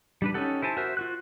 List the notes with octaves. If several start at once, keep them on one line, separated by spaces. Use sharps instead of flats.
G3 D4 B4
C#4 D#4 G4 A4 F#5
E4 C5 G#5 A5
F#4 A#4 C5 E5
F4 F#4 F#6